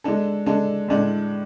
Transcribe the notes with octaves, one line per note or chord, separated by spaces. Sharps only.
G#3 D4 A4
G#3 D4 A4
A2 G#3 D4 A4 D5